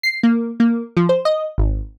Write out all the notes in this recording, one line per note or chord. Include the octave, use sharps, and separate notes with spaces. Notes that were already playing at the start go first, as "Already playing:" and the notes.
C7
A#3
A#3
F3
C5
D#5
G#1